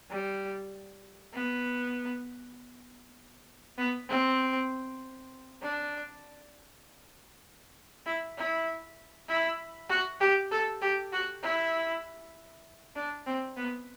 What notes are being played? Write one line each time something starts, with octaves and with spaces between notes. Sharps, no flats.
G3
B3
B3
C4
D4
E4
E4
E4
F#4
G4
A4
G4
F#4
E4
D4
C4
B3